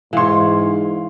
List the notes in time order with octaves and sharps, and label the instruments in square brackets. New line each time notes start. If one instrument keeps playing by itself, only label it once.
[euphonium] G#2 [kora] E3 C#5 [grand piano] F5 C6